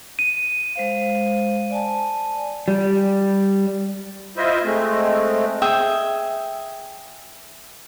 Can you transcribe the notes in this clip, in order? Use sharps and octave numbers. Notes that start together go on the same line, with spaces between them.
D#7
G#3 C5 F5
D5 G#5 A5
G3
E4 F4 C5 D#5 E5
G#3 A3 C4
G#4 E5 G5 D#6